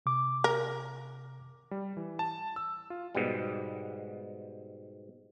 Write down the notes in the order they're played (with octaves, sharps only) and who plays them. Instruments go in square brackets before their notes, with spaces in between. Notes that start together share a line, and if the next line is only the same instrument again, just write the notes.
[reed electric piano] C3 D6
[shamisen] A#4
[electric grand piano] G3
E3
A5
E6
F4
[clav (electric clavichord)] G#2 B2 G3